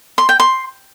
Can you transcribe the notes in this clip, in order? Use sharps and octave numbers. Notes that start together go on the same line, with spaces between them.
C6
G5
C6